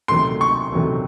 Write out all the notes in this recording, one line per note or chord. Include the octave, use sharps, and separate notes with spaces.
D2 C3 D#3 F#3 A3 C6
C#6
D2 C3 D#3 F#3 A3